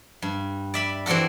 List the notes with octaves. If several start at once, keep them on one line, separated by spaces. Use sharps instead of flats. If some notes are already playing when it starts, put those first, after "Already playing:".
G2
D5 E5 B5
E3 C4 D4 F#4 A4